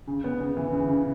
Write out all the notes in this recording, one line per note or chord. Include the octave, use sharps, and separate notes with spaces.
C#3
B3
C#3
E3
C#3
C#3